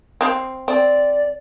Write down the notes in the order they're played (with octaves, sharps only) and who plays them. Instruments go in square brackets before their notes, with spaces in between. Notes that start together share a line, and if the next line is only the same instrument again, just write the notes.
[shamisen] C4 C5 F5
[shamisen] C4 [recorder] D5